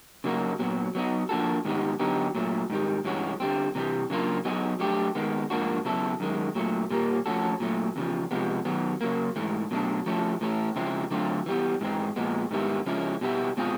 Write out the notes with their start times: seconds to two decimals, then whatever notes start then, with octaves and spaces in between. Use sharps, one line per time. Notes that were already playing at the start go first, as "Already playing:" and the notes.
0.24 C#3 F#3 A#3 D#4 F#4
0.59 A#2 F#3 B3
0.95 F#3 B3 D#4
1.29 F3 A#3 D4 F#4 A4
1.65 G#2 D#3 G3 B3 D#4
2.00 D3 F#3 B3 D#4 G4
2.35 A#2 F#3 A3
2.70 G#2 D#3 G3
3.05 G2 E3 G#3 C#4 F#4
3.40 D3 G3 C4
3.75 C3 E3 G3
4.10 C#3 F#3 A#3 D4 F4
4.45 F#3 B3 D#4 G#4
4.80 F#3 A3 D4 G4
5.15 D#3 G#3 B3
5.50 G#2 F3 A#3 D4 F#4
5.85 C#3 F#3 B3 E4 A4
6.20 F#2 D#3 G#3
6.55 A#2 F#3 A3
6.90 A#2 G3 A#3
7.26 F3 A3 C#4 F#4 A4
7.60 A#2 F#3 A3
7.96 E2 C#3 F3
8.31 C3 F3 G#3 B3
8.65 D#3 F#3 B3
9.01 C#3 F#3 A#3
9.36 G#2 E3 A3
9.71 B2 F#3 A3 D4
10.06 F3 A3 C#4 E4 A4
10.41 A2 E3 A3 C#4 E4
10.76 C#3 F3 G#3 C4 E4
11.11 D3 F#3 A3 C4 F4
11.46 E3 G3 B3
11.81 G#2 E3 G#3 C4
12.16 A#2 F3 G#3 B3
12.51 G#2 D#3 G3 B3 E4
12.86 C#3 F3 G#3 C#4 E4
13.21 B2 G3 B3 E4
13.57 B2 G#3 C4 F4 G#4